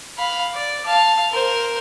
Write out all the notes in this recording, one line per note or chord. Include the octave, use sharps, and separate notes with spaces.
F5 B5
D5
F5 A5
A#4 C5